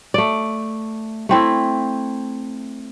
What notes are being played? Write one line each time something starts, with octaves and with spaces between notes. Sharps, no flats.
A3 D5
A3 C4 E4